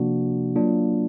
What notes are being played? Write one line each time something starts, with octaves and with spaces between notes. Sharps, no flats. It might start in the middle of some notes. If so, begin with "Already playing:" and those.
Already playing: C3 F3 A#3 D4 F#4
F#3 A#3 D4 F4